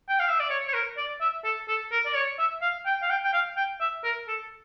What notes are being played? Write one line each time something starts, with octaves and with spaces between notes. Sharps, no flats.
G5
F5
E5
D5
C#5
C#5
A#4
D5
E5
A4
A4
A#4
D5
C#5
E5
F5
G5
F5
G5
G5
F5
G5
E5
A#4
A4